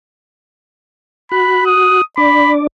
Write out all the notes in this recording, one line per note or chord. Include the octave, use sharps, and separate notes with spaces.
F#4 B5 F#6
D#6
D4 D5 B5 D6